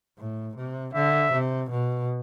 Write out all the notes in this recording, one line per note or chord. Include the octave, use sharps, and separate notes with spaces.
A2
C3
D3 E5
C3
B2